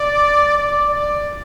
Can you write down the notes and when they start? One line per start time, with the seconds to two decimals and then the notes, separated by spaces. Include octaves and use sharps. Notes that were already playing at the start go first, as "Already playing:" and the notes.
Already playing: D5
0.57 D5
0.94 D5